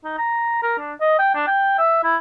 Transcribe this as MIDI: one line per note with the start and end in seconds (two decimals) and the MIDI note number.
0.05 0.15 63
0.18 0.57 82
0.63 0.74 70
0.79 0.92 62
1.01 1.16 75
1.19 1.35 79
1.35 1.44 62
1.47 1.75 79
1.79 2.00 76
2.04 2.16 64